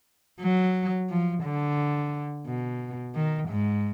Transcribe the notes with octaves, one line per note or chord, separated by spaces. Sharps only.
F#3
F3
D3
B2
D#3
G#2